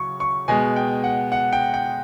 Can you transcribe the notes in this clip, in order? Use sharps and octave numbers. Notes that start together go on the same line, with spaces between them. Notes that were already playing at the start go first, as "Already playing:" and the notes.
Already playing: C#3 F#3 C#6
C#6
B2 G#3 G#5
G5
F#5
F#5
G5
G5